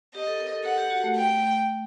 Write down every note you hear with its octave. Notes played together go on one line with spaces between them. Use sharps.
G4 D#5
A4
A#4
A4
A4 F#5
G4
F#4
A3
G5